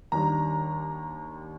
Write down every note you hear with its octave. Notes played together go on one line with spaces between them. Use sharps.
D#2 D#3 G3 D4 A#5